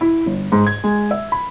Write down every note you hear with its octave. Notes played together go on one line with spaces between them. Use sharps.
E4
G1
G#2
G#6
G#3
E5
B5